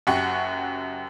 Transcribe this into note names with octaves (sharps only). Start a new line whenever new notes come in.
F#1 F#2 G4 F#5 C#6